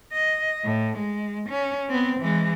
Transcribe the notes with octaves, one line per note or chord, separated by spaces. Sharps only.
D#5
A2
G#3
C#4
B3 C4
E3 G#3